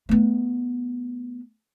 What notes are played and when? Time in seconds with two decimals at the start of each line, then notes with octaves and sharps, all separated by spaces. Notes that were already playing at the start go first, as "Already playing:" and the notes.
0.09 A3 B3